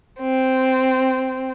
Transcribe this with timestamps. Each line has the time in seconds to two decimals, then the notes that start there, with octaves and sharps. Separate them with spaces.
0.19 C4